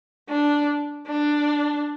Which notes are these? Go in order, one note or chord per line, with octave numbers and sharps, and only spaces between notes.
D4
D4